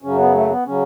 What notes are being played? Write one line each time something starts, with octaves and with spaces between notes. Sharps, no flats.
F#2 C#3 F#3 C#4
B3
A3
B3
C#3 F#3 C#4